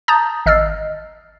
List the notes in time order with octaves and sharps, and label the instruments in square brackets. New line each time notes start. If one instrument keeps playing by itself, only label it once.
[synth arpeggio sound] A5 A#5 D#6 G6 A6
G#1 D#5 E6 F6 A6 C7